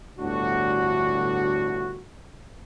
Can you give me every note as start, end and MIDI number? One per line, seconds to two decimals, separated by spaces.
0.19 2.01 31
0.19 2.01 38
0.19 2.01 45
0.19 2.01 62
0.19 2.01 66